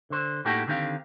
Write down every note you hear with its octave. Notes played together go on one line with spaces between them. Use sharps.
D3 C5
A2 A#3 D#4 F#4 G4 A4
D3 D#3 C4 G4 F5